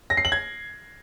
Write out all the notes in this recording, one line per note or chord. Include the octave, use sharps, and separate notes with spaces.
A#6
C7
F#7
G#6